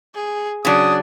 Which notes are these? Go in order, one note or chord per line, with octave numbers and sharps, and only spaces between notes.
G#4
C#3 F#3 D4 D#6